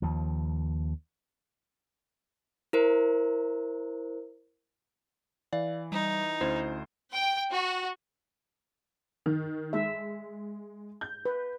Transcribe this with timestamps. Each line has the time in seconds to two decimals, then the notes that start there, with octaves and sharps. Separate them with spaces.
0.02 D#2 F3
2.73 E4 A#4 C5
5.53 E3 D5 F5
5.92 G3 D#4
6.41 D2 C#4 E4 C5
7.11 G5
7.51 F#4
9.26 D#3
9.73 G#3 E5
11.01 G6
11.25 B4